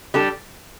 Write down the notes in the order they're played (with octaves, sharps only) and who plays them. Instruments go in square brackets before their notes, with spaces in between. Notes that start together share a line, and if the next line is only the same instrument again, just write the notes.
[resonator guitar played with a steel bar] G3 D4 A4